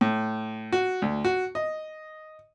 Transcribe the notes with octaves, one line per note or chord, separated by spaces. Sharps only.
A2
F#4
D2
F#4
D#5